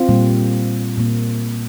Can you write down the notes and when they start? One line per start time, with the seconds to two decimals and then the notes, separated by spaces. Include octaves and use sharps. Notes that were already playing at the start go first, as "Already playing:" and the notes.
Already playing: C4 F4
0.09 A#2 G3 A#3
0.97 A#2 A#3